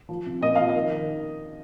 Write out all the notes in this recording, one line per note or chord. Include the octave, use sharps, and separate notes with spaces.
F3
C3
A#2 D#5
F3 F5
D#5
D#3
D#3